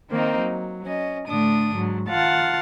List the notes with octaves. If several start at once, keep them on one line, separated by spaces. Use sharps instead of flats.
D#3 A#3 C4 D#4
F#3
C#4 D#5
A2 D3 A3 D4 D#6
G#2 F#3
D#3 F4 F5 F#5 A5 A6